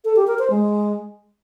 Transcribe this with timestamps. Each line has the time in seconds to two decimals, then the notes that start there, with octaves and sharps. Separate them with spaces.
0.05 A4
0.16 G4
0.27 A#4
0.39 C5
0.50 G#3